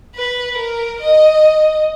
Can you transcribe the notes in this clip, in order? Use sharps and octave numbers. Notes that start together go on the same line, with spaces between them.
B4
A#4
D#5